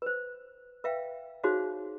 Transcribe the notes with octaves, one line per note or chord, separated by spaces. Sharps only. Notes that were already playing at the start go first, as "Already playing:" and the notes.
B4 C5
B4 E5 F5 G5
D#4 F#4 G#4 C5 C#5 F5